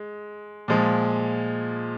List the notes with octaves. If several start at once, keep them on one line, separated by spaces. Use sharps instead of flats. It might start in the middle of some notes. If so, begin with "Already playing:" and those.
Already playing: G#3
A#2 F3 G#3